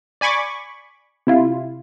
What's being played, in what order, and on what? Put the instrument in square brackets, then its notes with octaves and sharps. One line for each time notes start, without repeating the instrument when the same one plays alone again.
[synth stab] D5 G#5 B5 C#6 D6
C3 E4 F4